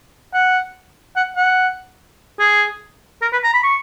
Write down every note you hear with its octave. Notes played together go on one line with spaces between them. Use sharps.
F#5
F#5
F#5
G#4
A#4
B4
A#5
B5
C#6